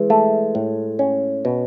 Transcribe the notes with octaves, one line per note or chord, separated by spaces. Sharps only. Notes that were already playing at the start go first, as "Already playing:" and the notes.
Already playing: E3 G#3
A3
A2
C#4
B2